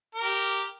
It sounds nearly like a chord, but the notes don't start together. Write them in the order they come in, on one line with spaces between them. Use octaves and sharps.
A#4 A#5 G4